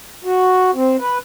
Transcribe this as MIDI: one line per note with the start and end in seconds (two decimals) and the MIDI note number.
0.25 0.71 66
0.75 0.96 60
1.00 1.18 71